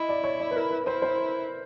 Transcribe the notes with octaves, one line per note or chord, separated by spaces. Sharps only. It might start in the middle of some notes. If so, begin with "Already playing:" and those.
Already playing: E4 D#5
D5
C#5
D5
B4
A#4
B4
E4 C5
C5